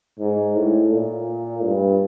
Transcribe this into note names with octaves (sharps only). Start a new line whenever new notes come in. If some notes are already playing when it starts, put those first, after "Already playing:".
G#2
A2
A#2
G2